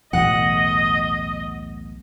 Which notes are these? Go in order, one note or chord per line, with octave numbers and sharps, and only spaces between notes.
B1 E2 A2 D#5 F#5